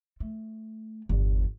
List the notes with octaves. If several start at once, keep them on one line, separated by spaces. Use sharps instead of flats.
A3
G1 E2